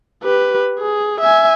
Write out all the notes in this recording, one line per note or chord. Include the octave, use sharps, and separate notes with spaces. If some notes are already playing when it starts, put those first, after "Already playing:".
G4 B4
G#4
E5 G#5